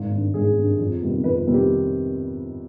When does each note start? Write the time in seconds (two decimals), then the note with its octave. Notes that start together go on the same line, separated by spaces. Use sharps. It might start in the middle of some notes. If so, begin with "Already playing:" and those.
Already playing: G#1
0.11 G2 D#3
0.34 G#1 G#4
0.57 G2 D#3
0.79 F2
1.01 C3 D#3 G3 B3
1.24 F2 B4
1.47 C3 D#3 G3 B3
1.54 G4